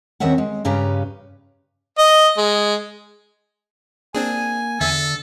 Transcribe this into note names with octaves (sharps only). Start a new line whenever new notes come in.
D#2 D#3 C4 C#4 E5 F#5
G#3
G2 C#3 C#4 G4 B4 A#5
D#5
G#3
A#3 C4 D4 G#4 G#5
E2 D3 A4 E5